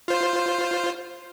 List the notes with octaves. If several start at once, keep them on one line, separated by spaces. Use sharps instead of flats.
F4 C5